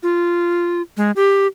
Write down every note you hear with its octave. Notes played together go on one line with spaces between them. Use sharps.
F4
G#3
G4